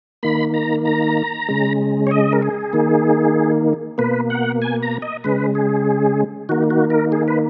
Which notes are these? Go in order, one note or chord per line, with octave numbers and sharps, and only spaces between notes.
D#3 A#3 B5
A#5
A#5
C#3 G#3
C#5
D#5
A#4
G#4
D#3 A#3
B2 A#3 B4
F#5
G#5
A#5
D#5
C#3 G#3 B4
G#4
D#3 A#3 F#4
F#4
A#4
G#4
B4